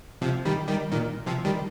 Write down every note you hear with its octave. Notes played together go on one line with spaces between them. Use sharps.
C3 F3
D#3 G3
D#3 G3
A#2 D#3
C3 F3
D#3 G3